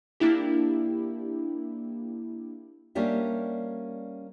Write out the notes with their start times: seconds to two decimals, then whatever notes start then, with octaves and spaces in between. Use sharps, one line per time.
0.20 A#3 D4 E4 G4
2.95 G3 A#3 C#4 D4 G4 E5